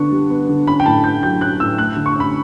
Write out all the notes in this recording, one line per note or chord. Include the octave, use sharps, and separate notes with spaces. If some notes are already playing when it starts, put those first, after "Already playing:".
Already playing: D3 B3 D4 C#6
G3
B3
D3
C#4 B5
G5
A2 A5
A2 G6
F#3 G6
C#4 F#6
A2 E6
A3 F#6
D3
C#6
C#4 B5